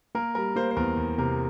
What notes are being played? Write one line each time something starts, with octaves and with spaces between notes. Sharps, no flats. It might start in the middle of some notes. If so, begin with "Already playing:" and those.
A#3 A#4
G3 A#4
A#3 C5
C5
E2 A#4
E2
C3 A#4